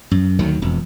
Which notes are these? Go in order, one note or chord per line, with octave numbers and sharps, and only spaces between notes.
F#2
D2 D#3 F#3
E1 F2